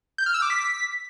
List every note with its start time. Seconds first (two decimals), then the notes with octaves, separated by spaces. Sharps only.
0.18 G6
0.26 F6
0.34 E6
0.42 D6
0.50 B6